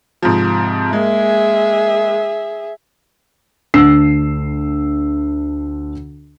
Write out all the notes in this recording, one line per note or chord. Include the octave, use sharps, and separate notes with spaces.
G#2 C3 F3
G#3 A#3 G#4 E5
D2 D4 E6 C7